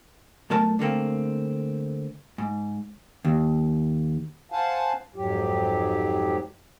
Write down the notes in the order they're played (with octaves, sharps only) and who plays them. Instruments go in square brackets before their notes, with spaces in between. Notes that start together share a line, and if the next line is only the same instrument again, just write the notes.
[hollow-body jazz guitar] B2 F#3 A3 A#4 A5
D3 A3 A#3 C4
G#2
D#2
[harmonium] C5 F5 F#5 G#5 A5
F2 G#2 F#3 G4